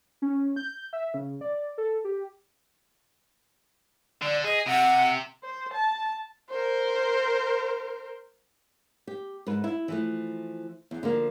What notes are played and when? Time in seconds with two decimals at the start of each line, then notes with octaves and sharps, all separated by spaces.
0.22 C#4
0.56 G6
0.93 E5
1.14 C#3
1.41 D5
1.78 A4
2.05 G4
4.22 D3 D5
4.45 G#4 D#5
4.67 C3 F#5
5.44 C5
5.74 A5
6.50 A#4 C5
9.07 G4
9.47 G#2 B4
9.64 E4
9.88 E3 F3 A3
10.91 E2
11.03 D3 F3 A#3